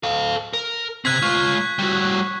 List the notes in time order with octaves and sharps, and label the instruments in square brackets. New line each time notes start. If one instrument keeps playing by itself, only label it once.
[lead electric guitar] A4 F5
A#4
[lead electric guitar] C3 C4 [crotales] F#6 G#6 B6
[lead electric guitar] G#3 F4 [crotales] C#6
[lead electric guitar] G3 F#4